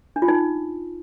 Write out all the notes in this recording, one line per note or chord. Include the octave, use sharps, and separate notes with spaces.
D4
F4
D#4